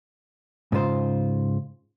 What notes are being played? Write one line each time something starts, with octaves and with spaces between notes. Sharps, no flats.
G#2 C#3 F4 C5